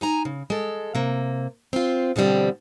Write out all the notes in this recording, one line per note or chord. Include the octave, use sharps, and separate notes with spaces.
D#4 G#5 A#5
C#3
G#3 A4
C3 A#3
C4 F4
B2 D3 F3 G3 C4